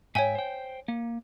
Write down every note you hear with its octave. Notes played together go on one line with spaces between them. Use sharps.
G#2 C#5 E5 G5 G#5
C5 G5
A#3